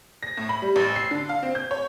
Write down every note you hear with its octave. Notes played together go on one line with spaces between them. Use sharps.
A#6
A2
B5
G3
A1
C7
D3
F5
C4
G6
C#5